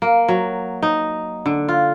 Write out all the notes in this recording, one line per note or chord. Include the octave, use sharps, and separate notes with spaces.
A#3
F#3
D#4
D3
F4